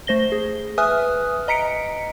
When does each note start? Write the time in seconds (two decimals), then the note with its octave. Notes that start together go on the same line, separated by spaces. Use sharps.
0.07 A3 C5 A#6 G7
0.32 G#4
0.78 B4 E5 G#5 D#6 F6 F#6
1.48 D#5 A#5 B6 C#7 D7